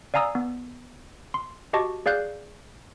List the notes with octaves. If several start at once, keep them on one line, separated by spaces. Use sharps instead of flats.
D5 F5 G#5 A#5 D#6 E6
B3
C6
F#4 G4 D#5 A5 C#6 D6
G#4 D5 F5 F#6 G6